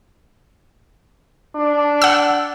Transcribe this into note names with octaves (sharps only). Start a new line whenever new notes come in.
D4
F#5 E6